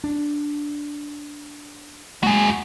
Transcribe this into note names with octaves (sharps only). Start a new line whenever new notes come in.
D4
G#3 A#3 F#4 G#4